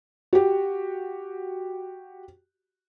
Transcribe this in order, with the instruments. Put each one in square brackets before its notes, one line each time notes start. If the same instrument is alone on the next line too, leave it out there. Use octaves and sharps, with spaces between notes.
[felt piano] F#4 G4